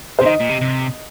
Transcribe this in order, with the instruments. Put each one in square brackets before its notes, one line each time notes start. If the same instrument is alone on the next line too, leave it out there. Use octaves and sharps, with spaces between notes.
[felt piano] C5
[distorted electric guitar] C3
[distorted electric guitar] D#3 [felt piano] D#5
[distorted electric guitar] A#2
C3
C3